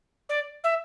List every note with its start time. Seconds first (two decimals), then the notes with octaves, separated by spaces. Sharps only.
0.29 D5
0.63 E5